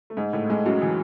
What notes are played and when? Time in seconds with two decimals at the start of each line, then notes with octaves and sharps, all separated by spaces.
0.10 A3
0.17 G#2 G#3
0.33 A2 A3
0.49 G#2 G#3
0.66 F#2 F#3
0.82 E3